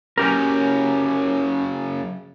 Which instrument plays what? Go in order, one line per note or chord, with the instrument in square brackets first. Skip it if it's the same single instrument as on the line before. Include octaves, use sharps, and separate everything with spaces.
[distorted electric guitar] F#2 C#3 [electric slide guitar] C#4 G4 A#4